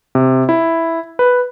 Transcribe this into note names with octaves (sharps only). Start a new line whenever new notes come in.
C3
E4
B4